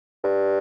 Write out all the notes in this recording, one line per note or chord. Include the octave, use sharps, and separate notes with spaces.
G2